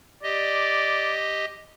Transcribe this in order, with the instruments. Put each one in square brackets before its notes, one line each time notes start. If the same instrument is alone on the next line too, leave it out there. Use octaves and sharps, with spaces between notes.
[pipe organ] G4 D#5 [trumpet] D5